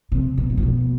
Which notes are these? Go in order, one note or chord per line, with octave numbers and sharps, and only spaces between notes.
C3
B2
G2
A2
B2